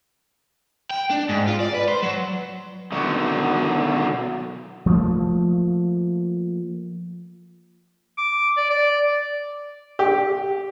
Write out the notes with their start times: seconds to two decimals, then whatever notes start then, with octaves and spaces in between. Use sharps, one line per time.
0.91 G5
1.11 D4
1.29 G#2
1.48 F4
1.60 D5
1.75 B4
1.88 C5
2.03 F#3
2.92 B2 D3 D#3 F#3 F#4
4.86 F3 A3 A#3
8.18 D6
8.57 D5
8.70 D5
9.99 G4